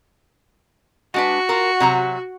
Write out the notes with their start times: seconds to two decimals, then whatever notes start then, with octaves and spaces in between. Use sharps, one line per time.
1.14 G#3 D4 F#4 B4
1.49 F4 A#4
1.80 C3 F#3 A#5